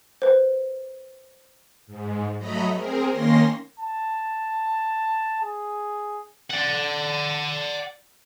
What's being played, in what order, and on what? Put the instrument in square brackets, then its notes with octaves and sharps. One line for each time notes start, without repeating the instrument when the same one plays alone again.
[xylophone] B4 C5
[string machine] G#2
F#3 A3 D#5 A#5 B5
C4 G#4 A#4
D#3 A#3 C#4 C6 A#6
[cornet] A5
G#4
[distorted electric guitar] D5 F#5